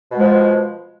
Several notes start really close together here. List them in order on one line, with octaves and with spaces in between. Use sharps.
B2 G#3 F3